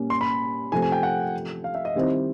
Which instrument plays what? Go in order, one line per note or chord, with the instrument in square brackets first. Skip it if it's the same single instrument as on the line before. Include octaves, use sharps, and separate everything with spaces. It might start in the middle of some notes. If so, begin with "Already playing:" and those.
Already playing: [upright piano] A#2 G3 A#3 C#4
[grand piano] C6
B5
[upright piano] C3 F3 A3 [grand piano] G#5
[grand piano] G#5
G5
F#5
F5
E5
D#5
[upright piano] D#3 G3 C4 E4